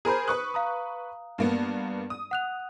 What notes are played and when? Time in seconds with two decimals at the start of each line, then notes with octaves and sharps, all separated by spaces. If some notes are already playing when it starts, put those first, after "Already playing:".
0.05 G#4 A#4 C5 A#5 B5 G6
0.28 B4 C#6 D#6 F#6
0.54 F5 A#5 D#6
1.38 G2 A#3 B3
2.10 D#6
2.31 F#5 F#6 F7